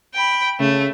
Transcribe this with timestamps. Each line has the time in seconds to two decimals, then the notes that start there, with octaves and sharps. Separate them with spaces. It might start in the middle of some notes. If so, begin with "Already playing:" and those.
0.15 G5 B5
0.60 C#3 A3